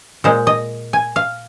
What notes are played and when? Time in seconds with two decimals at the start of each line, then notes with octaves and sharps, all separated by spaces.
0.24 A#2 G#3 C5
0.47 D#5
0.93 G#5
1.16 F5